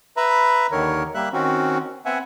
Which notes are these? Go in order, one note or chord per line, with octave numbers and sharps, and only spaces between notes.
B4 E5 A#5 B5
D#2 D3 D#3 A#4 C#5
G3 A#3 E5 F#6
D#3 C4 C#4 F#4
B3 C4 E5 F#5 G#5